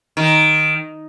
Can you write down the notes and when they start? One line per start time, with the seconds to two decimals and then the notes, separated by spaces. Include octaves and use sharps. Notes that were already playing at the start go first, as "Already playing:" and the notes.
0.17 D#3